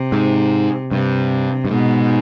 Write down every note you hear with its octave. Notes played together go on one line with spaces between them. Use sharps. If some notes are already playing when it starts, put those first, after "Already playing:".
Already playing: C3
G#2
G2 C3
G2
G#2 B2